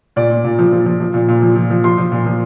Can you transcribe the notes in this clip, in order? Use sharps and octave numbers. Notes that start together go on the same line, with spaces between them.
A#2 D5
A#2
A#2
F3
F3
F3
F3
A#2
A#2
F3
F3
F3
F3 C6
F3
A#2
F3